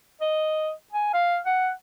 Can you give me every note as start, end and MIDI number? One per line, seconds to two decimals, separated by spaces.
0.21 0.71 75
0.92 1.11 80
1.13 1.38 77
1.46 1.71 78